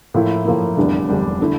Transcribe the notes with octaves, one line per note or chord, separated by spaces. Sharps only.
A2 F3 A#3 E4
A2 F3 A#3 E4
F1 E2 D3 G3 D4
F1 E2 D3 G3 D4
D3 A3 E4